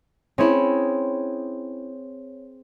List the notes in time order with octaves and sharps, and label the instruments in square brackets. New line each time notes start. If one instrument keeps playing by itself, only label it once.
[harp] C4 G#4 C#5 [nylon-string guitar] C#4 E4